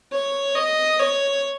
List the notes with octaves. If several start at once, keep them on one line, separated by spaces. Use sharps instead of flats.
C#5
D#5
C#5